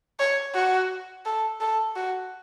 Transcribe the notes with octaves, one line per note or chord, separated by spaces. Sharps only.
C#5
F#4
A4
A4
F#4